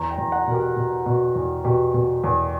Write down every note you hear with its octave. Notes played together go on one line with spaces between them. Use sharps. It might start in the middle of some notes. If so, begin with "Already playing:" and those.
Already playing: E2 A#5
G5
E2
F#5
B2 A#4
G4
B2
B2
E2
B2 G4
B2
E2